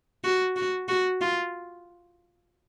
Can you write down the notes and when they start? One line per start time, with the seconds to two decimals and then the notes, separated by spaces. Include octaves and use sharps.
0.24 F#4
0.56 F#4
0.88 F#4
1.21 F4